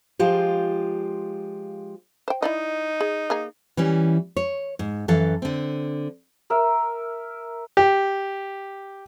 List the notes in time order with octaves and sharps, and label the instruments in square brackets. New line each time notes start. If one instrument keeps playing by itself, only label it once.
[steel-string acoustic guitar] F3 G#3 F4 G4
[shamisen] C5 G5
[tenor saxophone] D#4 [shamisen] E4 D5 D#5
[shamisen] G#4
A#3 G#4 A#5
[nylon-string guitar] E3 G3 C#4
C#5
G#2
F#2 E3 A4 F5
D3 C4
[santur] A#4 E5
[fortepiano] G4